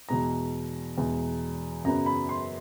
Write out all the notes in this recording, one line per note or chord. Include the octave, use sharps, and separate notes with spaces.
E2 B2 G#3 A#5
E2 B2 G#3
F#2 C#3 F#3 B3 A#5
B5
C6